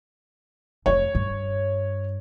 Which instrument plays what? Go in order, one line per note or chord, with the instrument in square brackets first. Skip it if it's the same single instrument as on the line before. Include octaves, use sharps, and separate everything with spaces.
[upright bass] F1 F2 [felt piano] C#5
[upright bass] G2